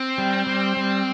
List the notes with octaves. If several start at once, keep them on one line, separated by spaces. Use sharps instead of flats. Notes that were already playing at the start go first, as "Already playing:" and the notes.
Already playing: C4
G3
G3
G3